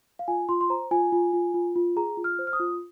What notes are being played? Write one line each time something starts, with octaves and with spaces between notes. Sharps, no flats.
F5
F4 G#5
F4 C6
C6
C5 A#5
F4 G#5
F4
F4
F4
F4
G#4 A#5
F4
F6
C5
F6
D#6
F4